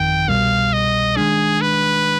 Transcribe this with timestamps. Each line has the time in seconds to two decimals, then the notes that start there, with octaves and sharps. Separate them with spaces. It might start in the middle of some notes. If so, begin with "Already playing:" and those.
Already playing: G1 F2 D#3 G5
0.28 C2 B2 G3 F5
0.73 D#5
1.17 D#3 G#3 D4 G#4
1.61 B4